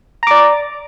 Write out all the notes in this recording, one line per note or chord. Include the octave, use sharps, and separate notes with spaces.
D5 A#5 D6